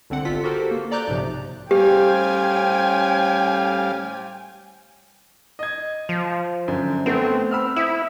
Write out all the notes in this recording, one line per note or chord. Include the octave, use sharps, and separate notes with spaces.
C2 D3 C4 F#5
G1 F4 A4 B6
F#4 G4 A4 A#4 C5
A#3
A4 D5 A#5 D6 F#6 G6
B1 G#2 C3 F3
A2 G3 C#4 G4 C5 F5 G5 G#5
D#5 G#6
F3
F#2 D3
A3 B3 C4
B5 E6 F6
E4 E5 D#6